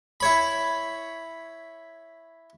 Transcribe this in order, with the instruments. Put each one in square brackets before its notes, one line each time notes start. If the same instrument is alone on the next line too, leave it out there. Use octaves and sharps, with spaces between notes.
[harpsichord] E4 C#5 B5